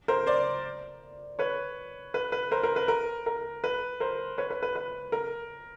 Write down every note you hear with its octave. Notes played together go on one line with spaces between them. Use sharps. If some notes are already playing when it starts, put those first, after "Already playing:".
A#4 C5
C5 D5
B4 C#5
B4
B4
A#4 C5
A#4 C5
B4
A#4
A#4
B4
A#4 C5
B4 C#5
B4
B4
B4
A#4